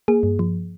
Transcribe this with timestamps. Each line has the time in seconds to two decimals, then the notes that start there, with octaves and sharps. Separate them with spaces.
0.08 A#3 G#4
0.23 G2
0.39 F3